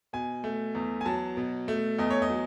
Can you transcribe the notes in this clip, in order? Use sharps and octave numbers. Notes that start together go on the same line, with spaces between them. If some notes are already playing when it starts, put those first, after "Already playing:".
B2 G#5
A3
E2
G#5
F#3 A5
B2
A3
E2 D#5
C#5
D#5
F#3